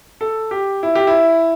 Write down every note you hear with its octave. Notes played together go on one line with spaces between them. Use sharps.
A4
G4
E4
G4
E4